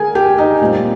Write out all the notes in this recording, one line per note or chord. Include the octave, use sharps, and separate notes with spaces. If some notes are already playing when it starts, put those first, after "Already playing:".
Already playing: D3 G#4 A#4 G#5
G4 G5
D#4 D#5
A#2 G3 C4